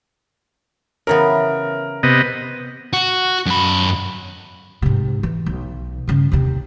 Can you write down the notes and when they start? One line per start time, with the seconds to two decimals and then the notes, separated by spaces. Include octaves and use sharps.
1.07 C#3 E3 B3 A#4
2.03 C3 B3 D#5
2.93 F#4
3.46 F#2 B5
4.82 G#2 C3
5.23 E3
5.46 B1
6.07 G2 C#3
6.32 D#2 C3